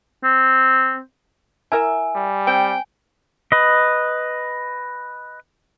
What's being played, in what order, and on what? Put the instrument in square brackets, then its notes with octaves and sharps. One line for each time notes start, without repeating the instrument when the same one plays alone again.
[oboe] C4
[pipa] E4 A#4 E5 [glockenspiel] G#5
[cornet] G3
[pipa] C4 [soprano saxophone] G5
[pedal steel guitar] B4 D#5